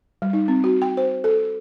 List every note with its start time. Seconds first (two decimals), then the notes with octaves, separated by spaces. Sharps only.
0.22 G3
0.33 D#4
0.48 C4
0.64 F#4
0.82 G5
0.97 C5
1.24 A4